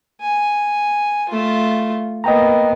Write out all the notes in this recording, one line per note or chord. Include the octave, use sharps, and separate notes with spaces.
G#5
A3 F4
A#3 B3 D#5 G5 A#5